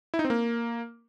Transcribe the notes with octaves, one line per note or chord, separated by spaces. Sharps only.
E4
D#4
C4
A#3